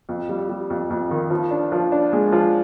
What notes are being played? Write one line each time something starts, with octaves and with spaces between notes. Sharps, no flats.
F2
G3
G3
F2
F2
D#3
F3
D4
F3
D4
G#3
F3